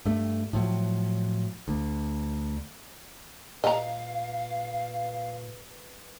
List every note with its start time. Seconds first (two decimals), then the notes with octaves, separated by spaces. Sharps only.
0.05 G2 A3
0.53 A2 F3 F#3
1.68 D2
3.64 A#2 B4 D#5 F5 A#5